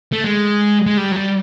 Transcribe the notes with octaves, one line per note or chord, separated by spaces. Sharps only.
A3
G#3
G#3
G3
F#3
G3